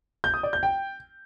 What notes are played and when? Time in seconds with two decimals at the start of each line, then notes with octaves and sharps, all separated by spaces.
0.24 G6
0.34 D#6
0.43 D5
0.53 G6
0.63 G5